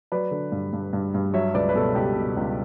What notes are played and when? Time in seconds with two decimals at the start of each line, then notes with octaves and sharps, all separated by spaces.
0.12 F#3 B4 D5
0.31 D3
0.52 G2
0.73 G2
0.93 G2
1.14 G2
1.34 F#3 C#5 E5
1.54 C#2 B4 D5
1.69 B4
1.75 B2 A4
1.95 C#2 G4
2.16 B2
2.37 C#2